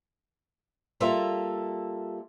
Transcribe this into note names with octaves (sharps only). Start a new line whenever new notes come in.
G3 A#3 F4 A4 E5